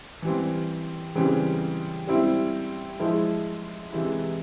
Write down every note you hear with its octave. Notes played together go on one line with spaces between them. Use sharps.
E3 G3 C4
C#3 E3 G3 C4
G3 C4 E4
F3 G#3 E4
C3 E3 G#3 E4